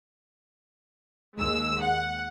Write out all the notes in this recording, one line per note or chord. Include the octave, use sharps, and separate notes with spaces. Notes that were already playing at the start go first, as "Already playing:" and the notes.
D#2 G#3 E6
F#5